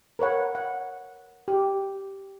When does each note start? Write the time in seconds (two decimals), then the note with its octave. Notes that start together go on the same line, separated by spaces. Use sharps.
0.19 A#4 B4 C#5 F#5
0.55 F#5
1.48 G4